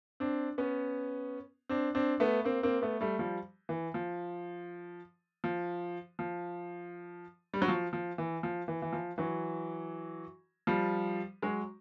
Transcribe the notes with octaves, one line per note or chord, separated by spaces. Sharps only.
C4 D4
B3 C#4
C4 D4
C4 D4
A3 B3
A#3 C4
A#3 C4
A3 B3
G3 A3
F3 G3
E3
F3
F3
F3
G3
F#3
F3
F3
E3
F3
E3
E3
F3
E3 F#3
F3 G3
F#3 G#3